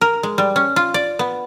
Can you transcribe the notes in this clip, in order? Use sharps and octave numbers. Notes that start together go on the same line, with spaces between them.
A#4
G#3
G3
C#4
F4
D5
B3